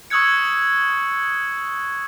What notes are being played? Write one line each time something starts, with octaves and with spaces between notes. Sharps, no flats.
C#6 D#6 E6 F#6 G#6 C#7